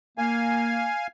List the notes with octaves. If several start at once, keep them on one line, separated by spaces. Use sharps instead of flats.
A#3 F5 G#5